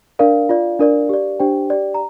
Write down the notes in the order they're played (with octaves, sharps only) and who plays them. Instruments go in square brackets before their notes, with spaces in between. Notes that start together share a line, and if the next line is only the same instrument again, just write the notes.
[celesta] D4 A#4 D5 F5
F4 D5
D4 A#4 D5
G4 D5
D4 G4 C5 G5
G4 D5
A#5